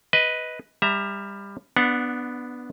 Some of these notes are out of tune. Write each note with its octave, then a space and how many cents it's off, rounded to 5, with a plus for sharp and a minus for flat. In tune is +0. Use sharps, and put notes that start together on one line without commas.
B4 +0 D#5 +15
G3 +25 E5 +0 A#5 +0
B3 +0 D4 +0 F#5 -25